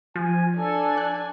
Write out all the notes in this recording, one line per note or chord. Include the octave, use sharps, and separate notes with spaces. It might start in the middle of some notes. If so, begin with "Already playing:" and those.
F3 G#5
D4 A4 G#5
F#6